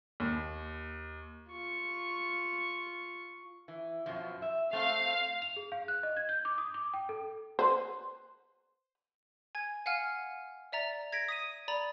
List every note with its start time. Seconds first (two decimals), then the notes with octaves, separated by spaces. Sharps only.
0.20 D#2
1.51 F4 C#6
3.68 E3
4.06 F#2 B2 F3
4.42 E5
4.73 A3 C4 F5
5.42 F7
5.56 G#4
5.72 F5
5.88 F#6
6.03 D#5
6.17 G#6
6.29 G6
6.45 D6
6.58 D#6
6.74 D6
6.94 G5
7.09 A4
7.59 B4 C5
9.55 G#5 G#6
9.86 F5 F#5 G#5 F6
10.72 D5 E5 A#5 A6
11.12 G#6 A#6 B6 D7
11.29 D#6 B6 D#7
11.68 D5 A#5 B5 A6